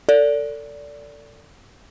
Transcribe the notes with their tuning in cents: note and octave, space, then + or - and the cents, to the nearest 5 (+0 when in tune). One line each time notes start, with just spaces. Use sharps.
A4 +30 D5 -20